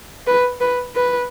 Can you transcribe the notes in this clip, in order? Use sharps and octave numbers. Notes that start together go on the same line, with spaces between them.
B4
B4
B4